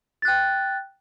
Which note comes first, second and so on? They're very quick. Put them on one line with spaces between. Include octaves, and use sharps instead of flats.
A6 F#6 G5